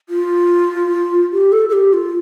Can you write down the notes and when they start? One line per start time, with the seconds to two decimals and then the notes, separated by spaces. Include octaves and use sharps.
0.09 F4
1.33 G4
1.52 A4
1.69 A4
1.73 G4
1.93 F4